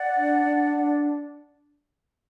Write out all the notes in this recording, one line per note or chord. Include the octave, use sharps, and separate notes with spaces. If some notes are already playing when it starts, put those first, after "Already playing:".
Already playing: D5 F#5
D4
D4
D4